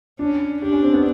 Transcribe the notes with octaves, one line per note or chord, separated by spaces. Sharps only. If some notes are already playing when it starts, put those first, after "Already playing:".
C#4 D4
D4 G4
C#4
C4
B3